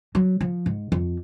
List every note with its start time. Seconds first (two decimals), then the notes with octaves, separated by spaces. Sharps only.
0.15 F#3
0.41 F3
0.66 G#2
0.92 F2